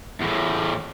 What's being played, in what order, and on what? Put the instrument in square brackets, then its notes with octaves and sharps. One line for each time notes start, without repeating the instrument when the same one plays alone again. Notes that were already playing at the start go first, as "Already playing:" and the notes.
[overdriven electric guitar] E2 A2